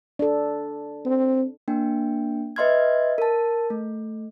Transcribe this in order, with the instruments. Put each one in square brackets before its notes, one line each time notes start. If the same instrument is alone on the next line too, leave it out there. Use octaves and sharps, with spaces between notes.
[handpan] D4 A4
[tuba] C4
[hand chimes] A#3 D4 G5
B4 D#5 E5 C6 F6 G#6
A#4 A5
A3